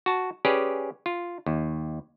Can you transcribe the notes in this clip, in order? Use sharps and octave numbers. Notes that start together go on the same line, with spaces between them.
F#4 A5
C#4 G4 G#4 B4 D5
F4
D#2